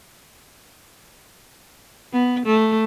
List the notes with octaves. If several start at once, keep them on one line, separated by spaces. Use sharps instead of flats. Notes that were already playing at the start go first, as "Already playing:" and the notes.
B3
A3